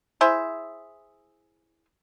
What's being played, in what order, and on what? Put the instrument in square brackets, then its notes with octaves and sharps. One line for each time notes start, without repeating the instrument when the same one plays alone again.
[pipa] E4 G#4 C5 E5